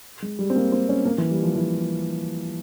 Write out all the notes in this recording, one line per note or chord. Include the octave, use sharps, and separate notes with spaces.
G#3
G3
C4
A#3
C4
C#4
A#3
E3
G3
F3
E3